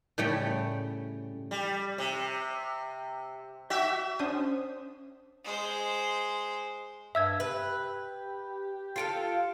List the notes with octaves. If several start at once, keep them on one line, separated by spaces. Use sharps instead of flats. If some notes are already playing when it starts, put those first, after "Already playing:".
A2 C#3 G3 A3 C#5 G5
G3
C3
F#4 E5
C#4 D4 C5 D#6
G#3 C5
G2 E5 E6 G#6
G4 B4
F4 A4 F5 C7 D7